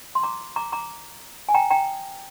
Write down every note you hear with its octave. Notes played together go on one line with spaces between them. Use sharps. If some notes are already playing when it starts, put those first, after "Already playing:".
C6
A#5 D6
A#5 D6
A#5 D6
G#5
G5 A#5
G5 A#5